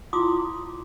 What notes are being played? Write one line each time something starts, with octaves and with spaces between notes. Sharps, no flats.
E4 F4 C6 D6 D#6